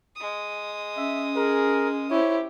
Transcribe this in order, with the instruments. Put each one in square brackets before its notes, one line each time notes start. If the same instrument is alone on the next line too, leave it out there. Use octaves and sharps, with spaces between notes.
[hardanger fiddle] G#3 D#6
[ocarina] C#4 [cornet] E5
[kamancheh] G#4 [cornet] A#4
[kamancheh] E4 C5 [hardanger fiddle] G4 [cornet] C#5